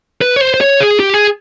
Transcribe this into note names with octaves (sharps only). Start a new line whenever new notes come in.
B4
C#5
C5
C5
C#5
G#4
G4
G#4